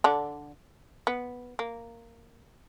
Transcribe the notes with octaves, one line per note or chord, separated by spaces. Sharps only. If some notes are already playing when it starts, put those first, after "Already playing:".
D3 D4
B3
A#3